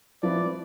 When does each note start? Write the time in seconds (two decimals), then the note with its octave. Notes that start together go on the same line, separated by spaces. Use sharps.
0.23 F3 C4 E4 B4 D5